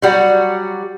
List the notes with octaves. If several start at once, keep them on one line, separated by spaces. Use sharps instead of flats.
F#3 G3 F#4